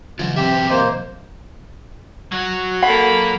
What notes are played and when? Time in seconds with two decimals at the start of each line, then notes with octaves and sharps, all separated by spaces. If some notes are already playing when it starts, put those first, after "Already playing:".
0.19 C#3 E3 F#3 F4
0.36 B2 C4 G4 E5
0.70 A#3 C5 D#5 A#5 D6
2.32 F#3 F#4
2.83 A#3 A4 F#5 B5